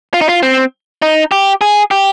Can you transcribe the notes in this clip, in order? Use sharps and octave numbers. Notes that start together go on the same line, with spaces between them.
F4
D#4
F4
C4
D#4
G4
G#4
G4